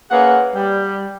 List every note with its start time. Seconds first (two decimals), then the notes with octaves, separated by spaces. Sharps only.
0.11 A#3 C#4 G#4 B4 F#5
0.55 G3